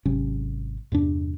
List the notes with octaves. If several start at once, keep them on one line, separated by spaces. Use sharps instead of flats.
G#1 C3 F#3 C#4
E2 G2 C3 D4